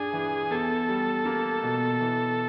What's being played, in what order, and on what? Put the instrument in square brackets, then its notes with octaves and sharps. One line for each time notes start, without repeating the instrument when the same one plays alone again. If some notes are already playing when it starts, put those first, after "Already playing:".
Already playing: [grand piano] G2 D4 [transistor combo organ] G#4
[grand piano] E3
[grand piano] E2 [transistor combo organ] A4
[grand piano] G3
A#3
B2
E3